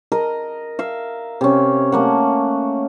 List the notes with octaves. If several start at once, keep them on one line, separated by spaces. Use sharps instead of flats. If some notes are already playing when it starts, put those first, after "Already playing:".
A#4 D#5
E5 F5
C3 C#4
A3 A#3 F#5